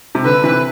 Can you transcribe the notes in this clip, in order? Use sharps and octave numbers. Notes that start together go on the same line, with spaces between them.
C3
D3 B4
C3 E3